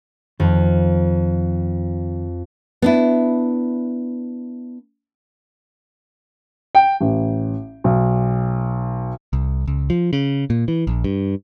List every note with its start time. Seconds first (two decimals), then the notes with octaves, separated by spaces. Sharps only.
0.40 F2 D#3 F3
2.82 B3 D4 E4
6.75 G5
7.01 A1
7.84 B1
9.33 C2
9.67 C#2
9.90 F3
10.13 C#3
10.50 A#2
10.68 E3
10.87 A#1
11.04 G2